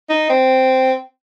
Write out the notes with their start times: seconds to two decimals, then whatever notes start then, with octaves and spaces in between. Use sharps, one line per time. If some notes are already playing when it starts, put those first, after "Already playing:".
0.10 D#4
0.29 C4